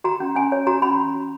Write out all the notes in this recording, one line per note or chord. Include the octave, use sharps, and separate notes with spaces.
F#4 A#5
C#4
C#4 G#5
C#5
F#4 A#5
C#4 B5